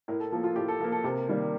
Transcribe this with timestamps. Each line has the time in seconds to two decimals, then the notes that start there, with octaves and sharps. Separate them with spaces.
0.08 A2 A#4
0.20 A4
0.32 F3 A#3 A4
0.44 F4
0.56 A2 G4
0.68 A4
0.80 F3 A#4
0.84 A#3
0.92 A4
1.04 C3 A#4
1.29 D#3 G3 A#3